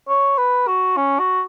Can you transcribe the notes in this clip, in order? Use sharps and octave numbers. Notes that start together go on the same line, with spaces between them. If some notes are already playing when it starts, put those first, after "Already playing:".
C#5
B4
F#4
C#4
F#4